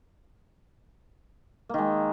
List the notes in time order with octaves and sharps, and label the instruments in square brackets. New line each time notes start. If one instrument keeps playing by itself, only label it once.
[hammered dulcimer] A#3
D#3
G#3